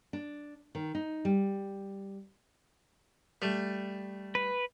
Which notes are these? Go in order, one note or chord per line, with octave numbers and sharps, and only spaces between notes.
D4
D#3
D#4
G3
G3 A3
B4